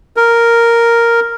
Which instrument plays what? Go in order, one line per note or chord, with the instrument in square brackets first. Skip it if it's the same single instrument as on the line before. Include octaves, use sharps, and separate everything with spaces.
[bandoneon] A#4